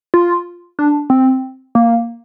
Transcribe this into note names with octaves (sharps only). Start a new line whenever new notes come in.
F4
D4
C4
A#3